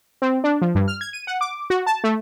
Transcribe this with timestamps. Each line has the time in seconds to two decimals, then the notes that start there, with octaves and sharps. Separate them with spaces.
0.22 C4
0.44 D4
0.62 F3
0.75 G2
0.88 F6
1.01 G#6
1.13 D#7
1.27 F#5
1.41 D6
1.70 F#4
1.87 A5
2.04 A3